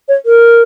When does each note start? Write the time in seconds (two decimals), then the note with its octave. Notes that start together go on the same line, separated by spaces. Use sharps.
0.08 C#5
0.26 A#4